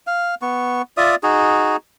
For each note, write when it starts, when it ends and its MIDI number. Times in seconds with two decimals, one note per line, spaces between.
0.07 0.35 77
0.42 0.82 59
0.42 0.82 85
0.97 1.15 65
0.97 1.15 74
0.97 1.15 76
0.97 1.15 87
1.23 1.76 63
1.23 1.76 66
1.23 1.76 68